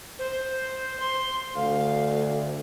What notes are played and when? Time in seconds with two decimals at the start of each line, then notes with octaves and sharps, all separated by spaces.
0.19 C5
1.00 C6
1.56 D2 F5